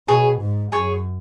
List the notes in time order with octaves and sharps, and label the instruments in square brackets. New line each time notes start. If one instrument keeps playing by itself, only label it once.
[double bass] B2 [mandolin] G#4 C#5
[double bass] G#2
[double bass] F#2 [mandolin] G#4 C#5